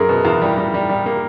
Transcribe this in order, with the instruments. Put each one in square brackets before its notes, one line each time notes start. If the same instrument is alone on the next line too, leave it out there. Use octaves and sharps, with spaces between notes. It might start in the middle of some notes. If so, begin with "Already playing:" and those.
Already playing: [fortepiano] F#2 [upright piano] G#4 A#4
[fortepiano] B2
E2
G3
G3
G3
G3
A#3